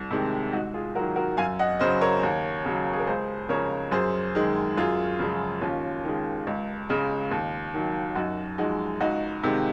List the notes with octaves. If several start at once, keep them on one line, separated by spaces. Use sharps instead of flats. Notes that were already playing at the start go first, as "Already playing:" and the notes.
Already playing: C2
C3 D#3 G#3
G#2 D#4 F#4
F4 G#4
D#3 F#3 F#4 A#4
F#4 A#4
F#2 F5 G#5
D#5 F#5
C#3 F#3 C5 D#5
A#4 C#5
D#2
C#3 F#3
G#4
A#4
C#2 G#4 C5
C#3 F3 A#4 C#5
F#2 G#4 C5
D#3 G#3
F#2 F4 G#4
C#3 F3 G#3
D#2 C#4 F4
D#3 G#3
C#2
C#3 G#3
D#2
D#3 F#3
F#2 D#4 F#4
F3 G#3 D#4 F#4
C#2 D#4 F#4
C3 D#3 G#3